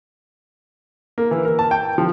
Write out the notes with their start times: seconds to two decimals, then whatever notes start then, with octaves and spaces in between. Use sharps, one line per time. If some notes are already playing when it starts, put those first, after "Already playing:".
1.18 A#3
1.31 E3
1.45 A#4
1.59 A5
1.71 G5
1.98 F3